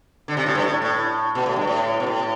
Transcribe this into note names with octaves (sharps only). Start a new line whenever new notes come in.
D3
C3
A2
G2
A2
A2
B2
A2
G2
A2
B2
A2